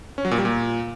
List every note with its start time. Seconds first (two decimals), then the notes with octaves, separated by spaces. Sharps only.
0.18 C#4
0.25 F#3
0.31 A#2
0.38 G3
0.45 A#2